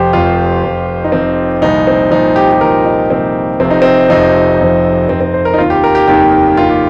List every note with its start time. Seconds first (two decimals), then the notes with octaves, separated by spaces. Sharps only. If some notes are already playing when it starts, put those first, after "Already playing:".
Already playing: F1 F2 F3 G4 C5
0.13 F1 F2 F3 F4
0.63 F1 F2 F3
1.04 D#4
1.12 F1 F2 F3 C4
1.62 C2 A#2 F3 D#4
1.87 C4
2.11 C2 A#2 F3 D#4
2.36 G4
2.52 G4
2.61 C2 A#2 F3 A#4
2.85 D#4
3.10 C2 A#2 F3 C4
3.60 F1 F2 C3 F3 C4
3.70 D#4
3.82 C4
4.09 F1 F2 C3 F3 D#4
4.59 F1 F2 C3 F3
5.08 F1 F2 C3 F3 C4
5.21 C4
5.34 C5
5.45 A#4
5.54 D#4
5.58 F1 D#2 D#3 F4
5.70 G4
5.84 A#4
5.95 G4
6.07 F1 D#2 D#3 G4
6.57 F1 D#2 D#3 F4
6.69 G4